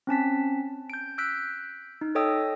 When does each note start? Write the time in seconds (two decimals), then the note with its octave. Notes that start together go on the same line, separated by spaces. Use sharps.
0.07 C4 C#4 A5 B6
0.90 G6 D7
1.18 E6 F#6 G6 B6 D7
2.01 D#4
2.15 A4 C#5 D#5 G5 D#6 E6